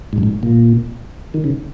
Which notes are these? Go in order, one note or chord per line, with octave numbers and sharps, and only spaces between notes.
G#2
F#2
G#2
A#2
D#3
C#3